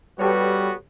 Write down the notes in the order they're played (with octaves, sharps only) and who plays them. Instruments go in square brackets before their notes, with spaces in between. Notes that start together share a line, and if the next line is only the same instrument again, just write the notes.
[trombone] G3 [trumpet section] B3 F#4 [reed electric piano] G4 A4 C#5 [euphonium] B4